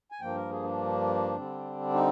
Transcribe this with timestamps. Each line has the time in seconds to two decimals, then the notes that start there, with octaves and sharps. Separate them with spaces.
0.12 G#5
0.21 G2 F3 A#3 G5
0.35 A#4
0.50 G#4
0.64 D4
1.36 D3 G3 C4
1.93 D#4